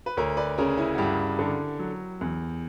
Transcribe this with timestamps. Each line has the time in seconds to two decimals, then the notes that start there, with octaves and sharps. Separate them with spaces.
0.06 B4
0.17 D2 A#4 C#5
0.37 B4 D5
0.58 C#3 A#4 C#5
0.78 C#4 E4
0.95 F#4
0.98 G2 E4 G4
1.39 D3
1.79 F#3
2.21 E2